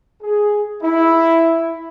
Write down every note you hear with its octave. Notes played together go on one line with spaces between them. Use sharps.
G#4
E4